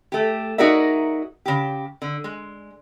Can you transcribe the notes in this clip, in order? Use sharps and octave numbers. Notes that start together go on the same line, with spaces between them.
A3 G4
D#4 F#4 G#4 A#4 D5 E5
C#3 G4
D3
G#3